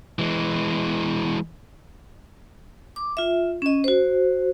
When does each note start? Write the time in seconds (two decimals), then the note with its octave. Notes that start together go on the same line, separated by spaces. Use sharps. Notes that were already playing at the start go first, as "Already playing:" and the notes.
0.19 E3 G#3
2.96 D6
3.17 F4 E5
3.62 C#4 D#5
3.84 F#4 C5